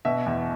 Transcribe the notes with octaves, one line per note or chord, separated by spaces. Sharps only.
B2 E5
E2